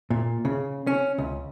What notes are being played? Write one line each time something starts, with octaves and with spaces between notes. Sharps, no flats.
A#2
C#3
C#4
C#2